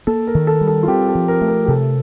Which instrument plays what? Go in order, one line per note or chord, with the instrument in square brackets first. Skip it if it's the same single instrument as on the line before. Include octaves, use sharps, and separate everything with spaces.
[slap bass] A#3 [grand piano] A4
[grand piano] A#4
[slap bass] D#3
[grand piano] A4
[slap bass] G3
[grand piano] A4
F4
[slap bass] C4 [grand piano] G4
[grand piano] A4
[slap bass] F3
[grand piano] A#4
[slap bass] A3
[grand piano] A#4
G4
[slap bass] C3 [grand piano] A4